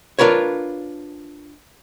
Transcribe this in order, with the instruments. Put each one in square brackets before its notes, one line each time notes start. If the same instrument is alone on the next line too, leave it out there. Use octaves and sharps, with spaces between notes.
[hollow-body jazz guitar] D4 F4 A#4 B4 C#5